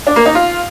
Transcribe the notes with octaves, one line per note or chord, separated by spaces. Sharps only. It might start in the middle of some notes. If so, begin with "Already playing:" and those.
D4
A#3
D#4
F4